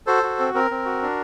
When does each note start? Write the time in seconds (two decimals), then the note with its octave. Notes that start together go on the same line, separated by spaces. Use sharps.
0.07 F#4 A4 C5
0.23 F#4
0.39 C4
0.55 C4 A#4
0.71 C4
0.85 F#4
1.02 D4